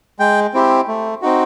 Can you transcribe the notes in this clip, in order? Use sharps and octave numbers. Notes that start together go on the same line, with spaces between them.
G#3 G5
C4 E4 G4
A3
C4 D#4 F#4